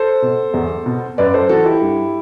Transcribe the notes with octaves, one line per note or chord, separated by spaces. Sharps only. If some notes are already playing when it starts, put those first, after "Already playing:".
Already playing: A4 C5
B2
E2
B2
F#2 B4 D5
A4 C5
E3 F#4 A4
E4 G4
G2